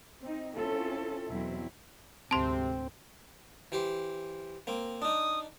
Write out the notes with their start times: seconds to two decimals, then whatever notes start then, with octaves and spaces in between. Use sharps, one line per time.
0.22 C4 D#4
0.56 C4 C#4 E4 F4 A4
1.29 E2 B2 F#3 C4 E4
2.31 D2 G#2 C3 C4 A5 C6
3.72 E3 G4 C5
4.67 A#3 C4
5.02 D4 D#4 D#6